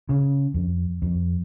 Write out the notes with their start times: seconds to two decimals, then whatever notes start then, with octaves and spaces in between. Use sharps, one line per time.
0.09 C#3
0.54 F2
1.02 F2